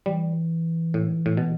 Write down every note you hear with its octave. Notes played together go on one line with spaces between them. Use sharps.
E3 G3
A2
A2
B2